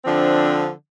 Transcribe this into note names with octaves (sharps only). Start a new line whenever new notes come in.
D3 F3 C4 D4